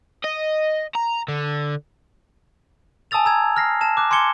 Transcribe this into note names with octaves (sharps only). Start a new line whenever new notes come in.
D#5
A#5
D3
G#5 A5 D#6 E6 A6 F7
A#5 E6 G#6
F6 A#6 C7
A5 E7
D6 F#6
G#5 C6 D6 G#6 C#7 G7